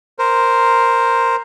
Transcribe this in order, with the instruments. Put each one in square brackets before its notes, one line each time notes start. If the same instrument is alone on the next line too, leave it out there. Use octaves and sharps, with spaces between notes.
[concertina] A#4 C5